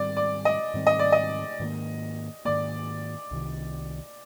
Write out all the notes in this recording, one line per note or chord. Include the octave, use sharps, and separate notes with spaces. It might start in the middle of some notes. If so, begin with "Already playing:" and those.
Already playing: G#2 D#3 G3 C4 D5
D5
D#5
G#2 D#3 G3 C4
D#5
D5
D#5
G#2 D#3 A#3
G#2 D#3 A#3 D5
C2 C3 D#3